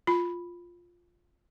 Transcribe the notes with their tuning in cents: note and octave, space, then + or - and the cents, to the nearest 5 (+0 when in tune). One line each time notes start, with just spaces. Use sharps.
F4 +0 B5 +0